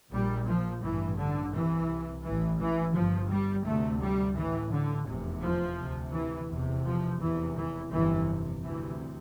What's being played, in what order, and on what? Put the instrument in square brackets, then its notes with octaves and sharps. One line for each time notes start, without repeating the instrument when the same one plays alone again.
[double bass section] A#1 A#2 G3
F3
A1 G2 E3
D3
C2 C3 E3
A1 A2 E3
E3
G1 G2 F3
G3
D2 C3 A3
G3
A1 A2 E3
D3
F1 E2 C3
F3
D2 C3
E3
F1 E2 C3
F3
F1 E2 C3 E3
E3
G1 F2 C3 E3
D2 C3 E3